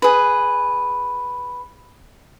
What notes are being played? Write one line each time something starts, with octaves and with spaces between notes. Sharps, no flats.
G#4 B4